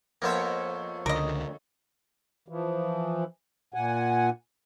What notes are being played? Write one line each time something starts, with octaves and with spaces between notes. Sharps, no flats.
F2 A#3 B3 C5 C#5 E5
C#2 D3 A#4 D#5
E3 F3
A#2 F#5 G#5